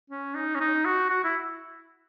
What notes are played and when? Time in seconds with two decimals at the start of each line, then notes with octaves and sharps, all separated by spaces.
0.10 C#4
0.35 D#4
0.55 C#4
0.60 D#4
0.85 F#4
1.10 F#4
1.24 E4